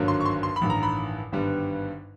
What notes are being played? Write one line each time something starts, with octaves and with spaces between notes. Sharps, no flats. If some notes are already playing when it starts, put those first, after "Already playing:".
Already playing: G#1 G2 D3 F#3 A#3
C6
C#6
C6
C6
B5
A1 G2 D#3
A#5
B5
G#1 G2 D3 G3 B3